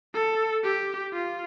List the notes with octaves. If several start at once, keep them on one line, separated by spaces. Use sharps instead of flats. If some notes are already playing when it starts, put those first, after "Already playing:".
A4
G4
F4